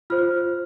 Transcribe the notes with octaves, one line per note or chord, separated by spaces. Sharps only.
F4 C5 F6